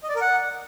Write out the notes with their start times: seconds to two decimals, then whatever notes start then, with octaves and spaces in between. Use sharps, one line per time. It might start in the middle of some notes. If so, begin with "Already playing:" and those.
0.03 D#5
0.09 D5
0.15 A#4
0.21 F#5